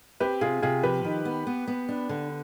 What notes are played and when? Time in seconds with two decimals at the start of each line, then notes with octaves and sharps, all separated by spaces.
0.20 C4 G4 B4
0.41 C3 F4 G#4
0.62 C3 F4 G#4
0.83 F3 G4 B4
1.04 D#3
1.25 B3
1.47 B3
1.67 B3
1.89 D4
2.09 D3